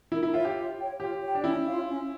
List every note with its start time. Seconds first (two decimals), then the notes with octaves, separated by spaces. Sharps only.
0.12 E4 A#4
0.23 E4
0.33 F4 C#5 E5
0.45 G4
0.56 F4
0.78 C#5 G5
1.00 F4 G4
1.21 C#5 G5
1.35 D4
1.44 C#4 E4
1.66 F4 C#5 F5
1.88 C#4